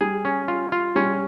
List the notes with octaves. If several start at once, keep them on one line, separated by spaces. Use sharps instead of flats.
G3 G#4
C#4
F4
F4
G3 C#4